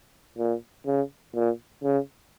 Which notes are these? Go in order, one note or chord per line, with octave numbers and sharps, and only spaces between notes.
A#2
C#3
A#2
C#3